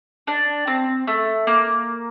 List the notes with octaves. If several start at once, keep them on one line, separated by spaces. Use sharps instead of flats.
D4
C4
A3
A#3